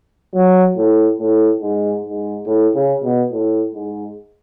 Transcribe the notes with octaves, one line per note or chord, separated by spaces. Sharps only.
F#3
A2
A2
G#2
G#2
A2
C#3
B2
A2
G#2